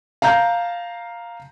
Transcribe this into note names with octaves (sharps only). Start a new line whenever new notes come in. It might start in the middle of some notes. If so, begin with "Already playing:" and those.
F5 A5 A#5 G6